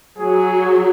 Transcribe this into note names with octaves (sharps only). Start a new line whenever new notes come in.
F#3 G#4